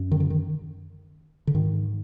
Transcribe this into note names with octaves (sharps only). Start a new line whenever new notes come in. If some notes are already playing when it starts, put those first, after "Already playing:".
Already playing: F#2
D#3
D3
D#3
D3
G#2 D#3